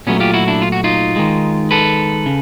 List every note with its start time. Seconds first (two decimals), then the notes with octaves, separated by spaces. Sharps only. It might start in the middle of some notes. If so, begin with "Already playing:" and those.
0.07 A#2 F#3 A3 B3 C#4
0.20 F4 G4
0.34 E4 F#4
0.47 D4 E4
0.62 F4
0.72 F#4
0.84 D#4 F4
1.16 D#3 G#3
1.71 A4 B4
2.26 C#3